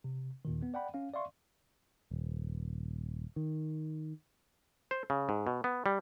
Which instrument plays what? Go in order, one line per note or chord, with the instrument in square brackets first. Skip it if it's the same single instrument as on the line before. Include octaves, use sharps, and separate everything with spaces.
[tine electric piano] C3
D#2 A#2 D#3
B3
D5 F#5 G5 B5
C#4 F5
D5 E5 F5 C6 C#6
[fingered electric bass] D#1
D#3
[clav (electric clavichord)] C5
C#3
G#2
B2
B3
G3